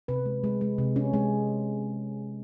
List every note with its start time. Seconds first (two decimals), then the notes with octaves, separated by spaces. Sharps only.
0.08 C3 B4
0.26 G#3
0.44 G#3
0.61 G#3
0.78 C3
0.96 C#4
1.13 G#3